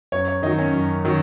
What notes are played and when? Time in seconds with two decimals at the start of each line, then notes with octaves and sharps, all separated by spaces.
0.12 F#2 C#5
0.28 C#5
0.42 D#3 F#3 D#4
0.58 C#4
0.73 F#2
1.05 D#3 F#3